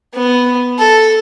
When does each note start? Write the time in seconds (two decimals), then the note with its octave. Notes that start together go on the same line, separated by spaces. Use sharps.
0.14 B3
0.78 A4